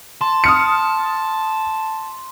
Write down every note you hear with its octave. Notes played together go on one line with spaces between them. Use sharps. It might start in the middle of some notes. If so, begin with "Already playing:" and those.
A5 C6
D#6 F6 C#7